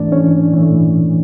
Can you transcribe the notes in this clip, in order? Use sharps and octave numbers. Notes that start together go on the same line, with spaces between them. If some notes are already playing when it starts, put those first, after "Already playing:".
Already playing: G#2 E3 A3 D4 D5
C#4 C#5
G#2 E3 A3